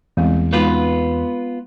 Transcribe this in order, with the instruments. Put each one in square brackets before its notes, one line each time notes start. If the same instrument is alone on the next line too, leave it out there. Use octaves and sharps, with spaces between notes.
[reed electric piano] E2 [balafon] G3 G#3 C4
[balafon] G#3 D#4 F#4 [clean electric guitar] B3 F4 B4